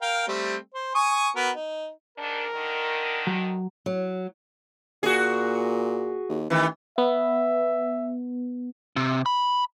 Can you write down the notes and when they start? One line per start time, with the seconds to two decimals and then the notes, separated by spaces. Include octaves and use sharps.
0.02 A#4 F5 G5
0.28 G3 A3 C4
0.74 C5
0.95 G#5 C#6 D#6
1.36 B3 F#4 A#4
1.55 D#4
2.18 G#2 D#3 D4 A#4
2.54 D3 D#3
3.27 F#3
3.86 F#3
5.03 A#2 F#4 G#4
6.29 D#2
6.50 A1 D#3 E3
6.98 B3 E5
8.96 C3
9.26 B5